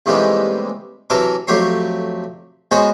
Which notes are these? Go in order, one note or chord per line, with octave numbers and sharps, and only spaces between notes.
D#2 A2 C3 E3 G3 G#3
C3 E3 F#3 A4 A#4 D6
F2 F#3 A3 G4 C#5 C6
G#3 B3 C#4 F#4 C5 C#5